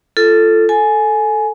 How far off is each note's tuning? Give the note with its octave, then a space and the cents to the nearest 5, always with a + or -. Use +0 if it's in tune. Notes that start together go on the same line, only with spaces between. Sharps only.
F4 -20 A4 +0
A4 +0 G#5 +15